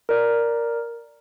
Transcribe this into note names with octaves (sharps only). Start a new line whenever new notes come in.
A#4 D5